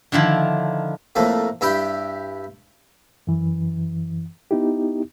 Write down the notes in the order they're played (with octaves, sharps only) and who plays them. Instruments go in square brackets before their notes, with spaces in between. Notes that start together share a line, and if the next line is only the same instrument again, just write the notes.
[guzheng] D3 D#3 F3 E4
[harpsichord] F2 A2 A3 A#3
G2 E4 G4 G5
[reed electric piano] F#2 E3
B3 D#4 E4 G4